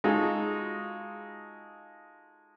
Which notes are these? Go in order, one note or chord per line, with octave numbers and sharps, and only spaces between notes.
G#3 D#4 F4 F#4 G#4 A4